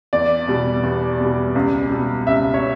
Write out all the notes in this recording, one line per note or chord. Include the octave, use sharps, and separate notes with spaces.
E2 D5
B2 G3
E2
B2 G3
C#2
B2 G3
C#2 E5
C#5